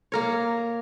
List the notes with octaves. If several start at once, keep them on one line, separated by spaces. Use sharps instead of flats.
A#3 A#4 C#5